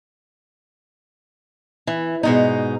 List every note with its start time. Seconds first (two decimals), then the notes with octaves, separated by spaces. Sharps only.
1.87 E3
2.23 G#2 B2 D#4